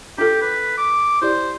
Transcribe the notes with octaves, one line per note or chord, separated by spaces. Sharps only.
D4 F4 G4 A4
B4
D6
E4 G4 C5 D5